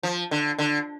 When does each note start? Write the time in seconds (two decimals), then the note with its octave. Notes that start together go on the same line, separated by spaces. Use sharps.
0.03 F3
0.31 D3
0.58 D3